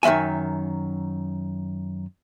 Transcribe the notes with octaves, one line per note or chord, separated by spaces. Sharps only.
F#2 D#3 G#3 E5 G#5